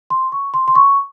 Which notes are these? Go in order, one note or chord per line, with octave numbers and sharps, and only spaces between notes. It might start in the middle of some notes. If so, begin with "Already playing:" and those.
C6
C#6
C6
C6
C#6